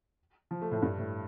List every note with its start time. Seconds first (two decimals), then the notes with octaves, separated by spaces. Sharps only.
0.51 F3
0.61 A3
0.71 A2
0.82 G2
0.98 A2